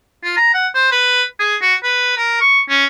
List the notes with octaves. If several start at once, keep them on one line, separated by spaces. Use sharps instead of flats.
F4
A#5
F#5
C5
B4
G#4
F#4
B4
A#4
C#6
C#4